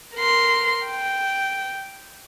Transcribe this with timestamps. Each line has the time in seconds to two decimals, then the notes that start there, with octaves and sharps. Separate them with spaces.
0.15 A#4 C6
0.86 G5